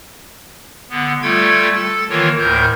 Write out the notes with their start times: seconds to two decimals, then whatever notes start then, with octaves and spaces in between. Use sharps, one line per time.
0.90 D3 B3
1.22 G3 A3 F4 A4 G5 G#6
1.73 A4 A6
2.09 D#3 E3 A#3 F4 A#4 C#5
2.39 D2 A2 A#4 G6